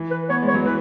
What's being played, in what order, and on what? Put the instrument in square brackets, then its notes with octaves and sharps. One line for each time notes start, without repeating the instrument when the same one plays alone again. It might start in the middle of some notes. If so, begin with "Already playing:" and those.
Already playing: [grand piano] E3
[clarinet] B4
[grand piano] B3 [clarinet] C#5
[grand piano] G#3
[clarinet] C#5
[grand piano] F#3
[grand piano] E3 [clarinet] B4